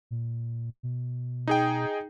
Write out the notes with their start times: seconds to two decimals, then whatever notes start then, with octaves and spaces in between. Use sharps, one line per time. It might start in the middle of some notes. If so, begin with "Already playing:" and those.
0.11 A#2
0.83 B2
1.47 D#4 G#4 G5